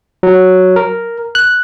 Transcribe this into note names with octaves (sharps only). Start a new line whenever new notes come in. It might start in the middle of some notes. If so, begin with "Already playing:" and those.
F#3
A#4
F#6